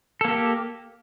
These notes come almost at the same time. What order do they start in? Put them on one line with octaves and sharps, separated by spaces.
A4 A#3 G4